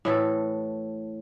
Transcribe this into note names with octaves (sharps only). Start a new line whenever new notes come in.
A2 E3 A4